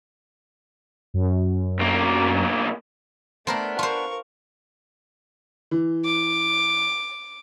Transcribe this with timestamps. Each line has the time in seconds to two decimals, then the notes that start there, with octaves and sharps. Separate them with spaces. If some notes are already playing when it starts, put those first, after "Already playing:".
1.14 F#2
1.79 B1 A#3
3.47 A3 B3 D4 A#4 C5
3.79 F4 A#4 C5 C#6
5.71 E3
6.06 D6